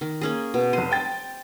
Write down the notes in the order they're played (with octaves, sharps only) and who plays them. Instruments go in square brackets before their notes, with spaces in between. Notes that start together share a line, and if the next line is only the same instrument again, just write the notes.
[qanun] D#3
A#3 C#4 G#4
B2
[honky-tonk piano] F1 D#7 [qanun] C5
[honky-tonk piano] G5 A6